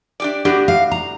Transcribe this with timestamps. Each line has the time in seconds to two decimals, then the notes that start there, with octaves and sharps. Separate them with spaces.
0.20 D4 G4 D5
0.45 A2 D4 F#4 G4
0.68 F5
0.91 A#5